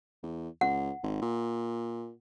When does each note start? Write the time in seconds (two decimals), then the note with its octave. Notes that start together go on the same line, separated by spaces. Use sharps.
0.23 E2
0.61 C#2 F#5
1.03 G#1
1.22 A#2